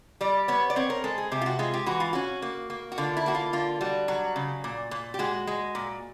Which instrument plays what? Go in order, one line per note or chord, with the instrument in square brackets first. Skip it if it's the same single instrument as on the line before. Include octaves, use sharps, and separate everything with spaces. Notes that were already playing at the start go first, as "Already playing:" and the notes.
[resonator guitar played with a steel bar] G3 D5
B3 C#5
D5
C4 C#5
A#4
G#3 A4
G#4
C3 G4
F4
F#4
G#3 F4
G4
E3 F#4
F4
C#4 F#4
A#3
A#3
F#4
D3 F4
E4
A#3 F#4
F4
D3 F4
G3 F#4
F#3 F#4
C#3
A#2
A#2
G4
G#3 F#4
G#3
A#2